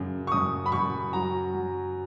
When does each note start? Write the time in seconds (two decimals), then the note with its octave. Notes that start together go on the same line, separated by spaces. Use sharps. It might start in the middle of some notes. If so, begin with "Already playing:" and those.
Already playing: F#2 C#3
0.27 C#6
0.32 F#2 D#6
0.66 B5
0.72 F#2 C#6
1.13 F#3 A#5
1.53 F#3